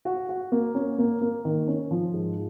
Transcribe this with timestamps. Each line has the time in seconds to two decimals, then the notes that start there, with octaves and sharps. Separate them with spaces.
0.05 F#4
0.29 F#4
0.52 A#3
0.75 C#4
0.98 A#3
1.22 A#3
1.45 D#3
1.68 C#4
1.91 F3
2.14 G#2